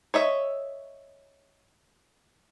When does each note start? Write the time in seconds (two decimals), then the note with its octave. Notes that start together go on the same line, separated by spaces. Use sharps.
0.14 C#5 D#5 E5